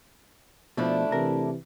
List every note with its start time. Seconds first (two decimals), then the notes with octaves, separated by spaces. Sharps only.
0.77 B2 F3 A3 D4 E4
1.12 C3 E3 A#4